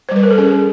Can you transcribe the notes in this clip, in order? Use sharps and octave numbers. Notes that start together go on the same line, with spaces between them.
C5
G3 B4
A#4
A4
C#4 G#4